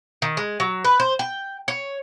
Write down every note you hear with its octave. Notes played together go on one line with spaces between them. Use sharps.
D#3
G#3
F#3
B4
C5
G5
C#5